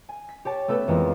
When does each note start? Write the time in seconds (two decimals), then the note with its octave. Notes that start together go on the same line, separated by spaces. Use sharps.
0.09 G#5
0.29 B6
0.45 G4 C#5 A5
0.68 A3 B3 A4 B4
0.88 F2 E3 G#3 A#3 B3